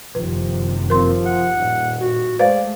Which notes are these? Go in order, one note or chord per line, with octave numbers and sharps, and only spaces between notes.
F#1 C3 D#3 F3 B4
F3 C4 A#4 C6
F#5
D#1 A#2
F#4
G#3 A3 B4 C5 D5 F5